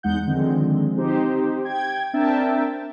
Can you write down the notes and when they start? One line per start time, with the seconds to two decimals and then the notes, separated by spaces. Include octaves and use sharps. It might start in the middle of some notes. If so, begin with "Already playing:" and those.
0.03 E2 G#3 D#4 F#5 G6
0.27 D3 D#3 F3 G#3 C4
0.96 C4 D#4 G4 C5
1.64 G5 G#6
2.14 C4 D4 A#4 E5 G5 A5